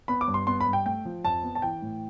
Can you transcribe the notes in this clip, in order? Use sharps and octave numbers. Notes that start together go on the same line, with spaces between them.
B3 B5
D6
G2
C6
B3 C6
B5
G2
G5
A3 G5
F3
F2 A5
B3
A5
E3 G5
A2